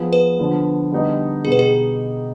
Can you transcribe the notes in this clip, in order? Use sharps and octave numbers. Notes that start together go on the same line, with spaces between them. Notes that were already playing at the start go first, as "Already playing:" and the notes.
Already playing: F3 B3 F4 G#4
B4
D3 F3 B3
D3 G3 B3 D#4 G4
B2 B3 D#4 G4 G#4
B4
G#4